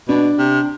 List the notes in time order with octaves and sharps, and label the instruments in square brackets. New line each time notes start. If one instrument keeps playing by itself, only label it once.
[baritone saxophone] B2 [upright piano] D4
[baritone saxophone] C3